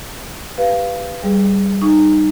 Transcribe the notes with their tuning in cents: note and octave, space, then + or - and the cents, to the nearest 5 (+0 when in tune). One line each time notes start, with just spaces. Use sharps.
G4 +0 B4 +0 F5 -15
G3 +0 G#4 +0 B4 +0
D#4 -20 C#6 +15